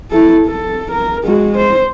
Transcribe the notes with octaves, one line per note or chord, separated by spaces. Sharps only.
E4 A4
A4
A#4
G#3 F#4
C5